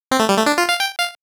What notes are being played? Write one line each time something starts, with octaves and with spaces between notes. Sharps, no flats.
C4
A3
G3
A3
D4
F4
F5
G5
F5